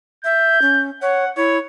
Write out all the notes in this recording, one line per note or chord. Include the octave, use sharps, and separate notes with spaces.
E5 G6
C#4
C#5 F#5
E4 C#5